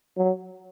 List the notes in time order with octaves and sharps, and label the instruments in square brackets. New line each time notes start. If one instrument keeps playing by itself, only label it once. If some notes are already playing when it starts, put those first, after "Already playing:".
[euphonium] F#3